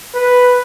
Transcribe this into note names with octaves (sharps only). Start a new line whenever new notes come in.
B4